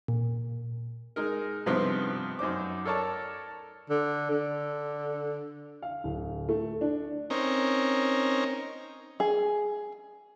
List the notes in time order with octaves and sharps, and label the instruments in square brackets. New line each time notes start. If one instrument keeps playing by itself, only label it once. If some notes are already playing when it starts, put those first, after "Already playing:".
[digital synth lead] A#2
[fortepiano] G#3 D#4 A#4
G2 C3 F3 B3 C4 D#4
F#2 D#4 C5 D6
A4 A#4 C#5 D5 A5
[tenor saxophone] D3
D3
[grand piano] F5
D1
A3
D4
[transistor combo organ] C4 C#4 D#4 A#4
[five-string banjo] G#4